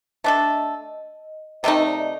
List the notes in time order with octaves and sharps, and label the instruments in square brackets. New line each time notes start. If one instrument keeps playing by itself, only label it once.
[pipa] A3 D4 A4 [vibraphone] D#5
[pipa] C3 D#3 A3 D#4 [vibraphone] D#5
[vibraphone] D5